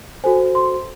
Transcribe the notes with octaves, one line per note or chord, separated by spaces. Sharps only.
F#4 A4 C5 G#5
C6